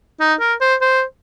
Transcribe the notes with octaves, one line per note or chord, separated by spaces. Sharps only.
D#4
A#4
C5
C5